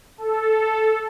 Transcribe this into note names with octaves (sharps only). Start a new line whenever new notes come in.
A4